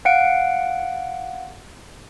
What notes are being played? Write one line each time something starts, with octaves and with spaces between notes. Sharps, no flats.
F5 F#5 D7